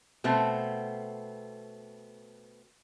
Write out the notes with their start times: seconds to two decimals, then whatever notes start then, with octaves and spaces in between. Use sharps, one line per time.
0.24 B2 A3 B3 C4